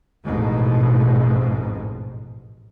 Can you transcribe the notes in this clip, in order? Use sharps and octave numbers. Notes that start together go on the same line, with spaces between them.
A1 F2 G#2 B2